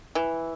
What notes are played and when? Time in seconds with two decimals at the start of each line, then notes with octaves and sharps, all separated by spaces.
0.15 E3